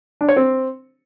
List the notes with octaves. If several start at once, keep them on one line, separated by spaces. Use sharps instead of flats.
D4
C#5
C4